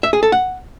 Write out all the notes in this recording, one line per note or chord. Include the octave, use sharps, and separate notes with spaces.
E5
G#4
A4
F#5